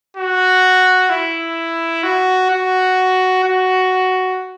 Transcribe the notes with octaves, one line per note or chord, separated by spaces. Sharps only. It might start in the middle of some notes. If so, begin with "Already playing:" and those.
F#4
E4
F#4
F#4
F#4